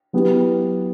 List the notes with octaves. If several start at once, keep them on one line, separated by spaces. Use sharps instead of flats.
F#3 B3 E4 G4